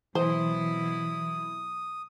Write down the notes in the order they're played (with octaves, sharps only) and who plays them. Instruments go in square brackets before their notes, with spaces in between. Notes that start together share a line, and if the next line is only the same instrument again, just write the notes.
[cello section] B2 F#3 E4 [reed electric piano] E3 [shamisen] C5 [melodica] D#6